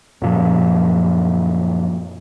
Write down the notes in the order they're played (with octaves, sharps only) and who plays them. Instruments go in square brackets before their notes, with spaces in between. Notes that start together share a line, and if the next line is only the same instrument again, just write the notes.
[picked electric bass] F#2 A#2 F3